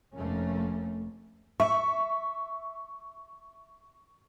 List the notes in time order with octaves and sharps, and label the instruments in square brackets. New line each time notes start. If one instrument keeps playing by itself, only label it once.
[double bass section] F1 F2 A3 A#3 C#4
[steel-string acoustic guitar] E5 [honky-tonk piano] C#6